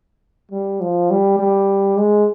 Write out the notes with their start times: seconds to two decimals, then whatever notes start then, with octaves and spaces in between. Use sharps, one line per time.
0.52 G3
0.81 F3
1.10 G3
1.39 G3
1.97 G#3